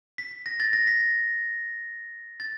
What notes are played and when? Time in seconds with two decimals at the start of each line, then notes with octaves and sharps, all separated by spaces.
0.18 B6
0.46 A#6
0.60 A6
0.73 A#6
0.87 B6
2.40 A6